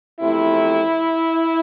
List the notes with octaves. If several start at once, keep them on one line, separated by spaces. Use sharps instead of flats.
E2 C3 F3 A3 E4